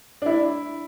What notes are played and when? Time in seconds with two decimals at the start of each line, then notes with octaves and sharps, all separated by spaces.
0.22 D4
0.26 E4